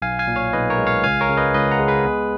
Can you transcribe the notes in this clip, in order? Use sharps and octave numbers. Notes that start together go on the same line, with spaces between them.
B1 F5 G#5
F5 G#5
A#2
C#5 F5
B1 B4 D#5
A#4 C#5
G#3
C#5 F5
C#2 F5 G#5
A#4 C#5
C#3
B4 D#5
C#2 B4 D#5
F#5 A#5
G#3
G#4 B4
B3